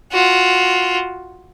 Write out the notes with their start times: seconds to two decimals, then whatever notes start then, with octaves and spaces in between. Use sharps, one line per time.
0.12 F4 F#4